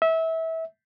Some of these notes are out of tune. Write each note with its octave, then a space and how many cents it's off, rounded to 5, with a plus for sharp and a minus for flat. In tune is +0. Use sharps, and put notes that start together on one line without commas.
E5 -25